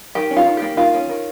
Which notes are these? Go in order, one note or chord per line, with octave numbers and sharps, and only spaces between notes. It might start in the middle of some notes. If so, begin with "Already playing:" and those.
D#3 G4
C#4
F4
D#3
A#3 G4
D#3 F4
C#4
D#3